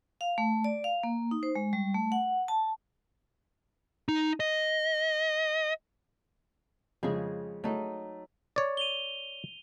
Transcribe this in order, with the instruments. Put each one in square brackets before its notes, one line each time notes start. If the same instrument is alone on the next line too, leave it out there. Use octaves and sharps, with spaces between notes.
[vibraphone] F5
A3
D5
F5
A#3
D#4
C5
G#3
G3
A3
F#5
A5
[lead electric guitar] D#4
D#5
[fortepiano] F2 C#3 [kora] G#3 G#4
[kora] F#3 D#4 [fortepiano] A3
[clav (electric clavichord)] C#5 D5
[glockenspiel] D#7 F7 G7